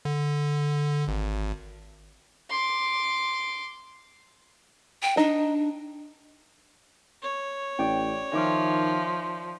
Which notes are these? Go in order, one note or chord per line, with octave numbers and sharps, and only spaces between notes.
D3
G#1
C6 D6
G5
D4 D#4
C#5
A1 D5 G5
D#3 F3 E5 D6 F6